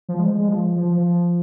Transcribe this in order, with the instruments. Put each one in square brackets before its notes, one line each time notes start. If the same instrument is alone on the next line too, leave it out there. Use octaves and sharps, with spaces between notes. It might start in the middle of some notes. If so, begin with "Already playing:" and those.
[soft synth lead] F3
G#3
G#3
F3
F3
F3